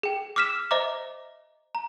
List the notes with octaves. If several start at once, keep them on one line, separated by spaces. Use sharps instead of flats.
G#4 G5
D6 E6 F6 B6 E7
C5 D#5 E5 A#5 D6
A#5